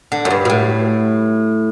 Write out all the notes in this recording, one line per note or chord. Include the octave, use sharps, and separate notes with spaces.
D3
F#2
G2
B2
A2